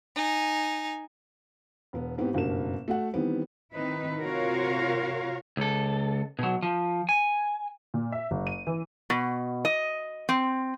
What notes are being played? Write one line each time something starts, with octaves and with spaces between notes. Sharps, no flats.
D#4 G#5
E1 B3
G#2 B3 C4 E4 G4
F#1 G2 B2 F#3 A#4 E7
A3 F#4 F#5
D#3 E3 G3 B3 C4
D#3 C4 D#4 E4 B4
C3 F4 F#4 A#4 C#5 F5
C#2 A4
B2 F#3
F3
G#5
A#2
E5
F#1
D#7
E3
B2
D#5
C4